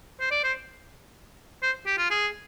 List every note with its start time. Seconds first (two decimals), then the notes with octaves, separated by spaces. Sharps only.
0.20 C5
0.31 D5
0.44 C5
1.63 C5
1.86 G4
1.98 F4
2.10 G#4